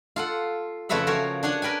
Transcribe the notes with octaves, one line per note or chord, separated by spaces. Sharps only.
F4 A4 F#5
F2 C#3 A3 B4 E5 F#5
F3 F#4 A#4 C#5
D4 C#5 F#5 G#5
A#4 B4 G5 G#5